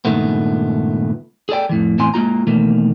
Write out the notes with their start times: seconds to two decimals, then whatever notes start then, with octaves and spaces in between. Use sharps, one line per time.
0.05 C#2 G2 A#2 D#3 A3 B3
1.49 G#4 A4 D5 G5
1.69 F2 A2 E3
1.98 E2 A2 C4 G#5 C6
2.14 G#3 A#3 F4 A#5
2.47 B2 D#3 E3 A3 A#3